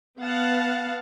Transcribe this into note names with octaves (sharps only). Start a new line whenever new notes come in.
B3 F5 F#5 A5